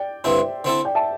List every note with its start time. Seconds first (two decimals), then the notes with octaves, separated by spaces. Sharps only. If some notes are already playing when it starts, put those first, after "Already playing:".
Already playing: D5 G5
0.24 G2 D3 C4 E4 C5 E5
0.64 D3 C4 E4 A4
0.85 D5 G5
0.95 E5 A5